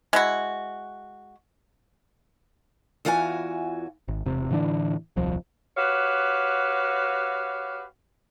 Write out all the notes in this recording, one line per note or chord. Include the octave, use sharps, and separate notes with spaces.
G#3 E4 F#4
E2 E3 F4 F#4 D#5 G#5
G#1
E1 C3
A2 D3 E3 D4
D#1 C2 F3
F#4 G4 B4 C#5 F5